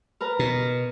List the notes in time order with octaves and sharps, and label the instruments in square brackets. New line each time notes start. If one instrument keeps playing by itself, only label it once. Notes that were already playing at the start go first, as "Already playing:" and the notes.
[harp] A#4 B4 A#5
[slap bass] B2